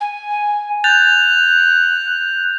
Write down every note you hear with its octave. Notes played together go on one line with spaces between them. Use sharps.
G#5
F#6 G6 A6 F7